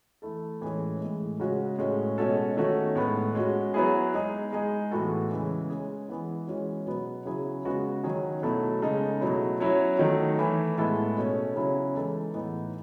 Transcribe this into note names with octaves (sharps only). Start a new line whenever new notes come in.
E3 A3 E4 A4
A2 E3 G#3 C#4 G#4
A2 E3 G#3
C#3 G#3 C#4 F#4
A2 G#3 C#4 F#4
B2 G#3 C#4 F#4 A4
D#3 A3 C#4 F#4
A2 G#3 B3
G#3 C#4 F#4
F#3 B3 E4 G#4
G#3 D#4 G#4
G#3 D#4 G#4
A2 E3 B3 F#4 A4
C#3 E3 G#3
G#3 C#4 G#4
E3 G#3 B3 E4
E3 G#3 C#4 F#4
B2 F#3 B3
C#3 F#3 C#4 E4 G#4
C#3 G#3 B3 F#4
D#3 F#3 C#4 G#4
B2 F#3 A3 E4 A4
C#3 G#3 D#4 A4
B2 F#3 A3 E4
F#3 C#4 E4
D#3 F#3 A3
E3 A3 E4
A2 G#3 B3 E4 A4
B2 A3 C#4
C#3 F#3 C#4 E4
E3 G#3 D#4 A4
A2 E3 B3 D#4